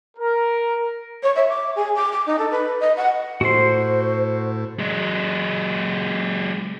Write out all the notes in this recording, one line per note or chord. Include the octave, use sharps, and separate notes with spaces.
A#4
C#5
E5
D6
G#4
D6
D6
D#4
A4
B4
D#5
F#5
A2 F#4 C5 C6
F#3 G#3